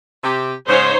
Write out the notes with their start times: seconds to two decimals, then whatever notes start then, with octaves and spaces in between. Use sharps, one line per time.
0.23 C3 G4
0.68 G#2 C#3 D#4 C5 C#5